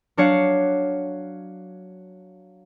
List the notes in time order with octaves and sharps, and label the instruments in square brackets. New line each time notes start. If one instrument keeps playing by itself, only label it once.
[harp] F#3 D4 C#5 F5 F#5